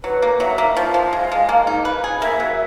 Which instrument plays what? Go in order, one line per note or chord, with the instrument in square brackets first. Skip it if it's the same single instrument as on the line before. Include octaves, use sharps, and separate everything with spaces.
[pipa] F#3 [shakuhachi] B4
[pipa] A#3
[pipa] F#3 [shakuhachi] E5
[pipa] A#3
[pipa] F3 [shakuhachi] F5
[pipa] F3
G#3
G#3
A#3
D#4
B4
G#4
[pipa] A#3 [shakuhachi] E5
[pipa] F#3